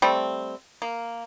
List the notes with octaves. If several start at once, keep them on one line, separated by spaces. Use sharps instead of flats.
G3 A3 C4
A#3